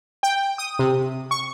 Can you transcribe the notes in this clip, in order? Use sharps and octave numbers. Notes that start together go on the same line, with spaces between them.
G5
D#6
C3
C#6